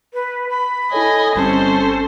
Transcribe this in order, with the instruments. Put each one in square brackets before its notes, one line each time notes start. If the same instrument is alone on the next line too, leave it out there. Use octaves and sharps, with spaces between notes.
[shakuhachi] B4
B5
[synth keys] E4 A4 C#5 [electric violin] D#5 G#5
[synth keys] G1 G3 C4 [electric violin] C#4 C5 [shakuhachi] A4